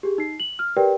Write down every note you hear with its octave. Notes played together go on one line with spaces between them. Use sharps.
G4 G#4
D#4 C7
F#7
F6
G4 A#4 B4 D5 G5